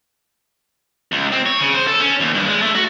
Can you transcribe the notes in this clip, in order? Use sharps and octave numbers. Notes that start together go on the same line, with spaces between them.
C#2
C4
C#5
C#3
C5
A4
C#4
D#2
G2
G#3
A3
F#4